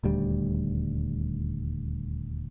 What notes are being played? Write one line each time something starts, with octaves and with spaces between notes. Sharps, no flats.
D#1 D2 G3